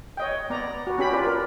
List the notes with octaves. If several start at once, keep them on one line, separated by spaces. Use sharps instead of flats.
C#5 D#5 G5
B3 D5 A#5
F#4 B4
C#4 G4 B5
F4 B4 D5
A#4